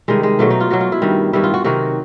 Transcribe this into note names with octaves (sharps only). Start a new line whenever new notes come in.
C3 D#3 G3 G#3
G#3
B2 F#3 A3
D#4
F4
B2 F#3 F#4
F4
E4
G2 D#3 G3
G2 D#3 G3 E4
F4
F#4
C3 D#3 F#3 F#4